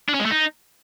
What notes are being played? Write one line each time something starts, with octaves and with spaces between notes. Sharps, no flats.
D4
C#4
G#3
A3
D#4